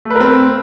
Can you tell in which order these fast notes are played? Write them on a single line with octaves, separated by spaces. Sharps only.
A3 B4 A#4 C4